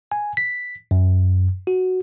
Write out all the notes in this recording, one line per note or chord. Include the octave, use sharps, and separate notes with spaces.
G#5
B6
F#2
F#4